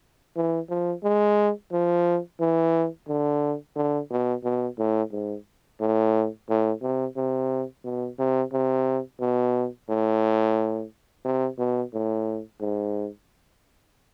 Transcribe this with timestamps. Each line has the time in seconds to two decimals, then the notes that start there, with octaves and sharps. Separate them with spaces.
0.36 E3
0.70 F3
1.04 G#3
1.72 F3
2.40 E3
3.08 D3
3.76 D3
4.11 B2
4.44 B2
4.79 A2
5.12 G#2
5.80 A2
6.49 A2
6.82 C3
7.16 C3
7.85 B2
8.19 C3
8.52 C3
9.21 B2
9.89 A2
11.25 C3
11.59 B2
11.93 A2
12.61 G#2